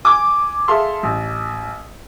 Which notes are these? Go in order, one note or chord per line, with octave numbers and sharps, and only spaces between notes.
G#5 D6
G#4 A4 E5 F5 C6
A1